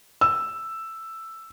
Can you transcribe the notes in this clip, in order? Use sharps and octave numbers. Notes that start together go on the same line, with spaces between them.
E6